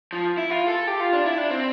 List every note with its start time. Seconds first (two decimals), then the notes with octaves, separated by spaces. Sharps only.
0.13 F3
0.37 E4
0.51 F4
0.68 A4
0.87 G4
1.00 F4
1.13 D4
1.26 E4
1.38 D4
1.50 C4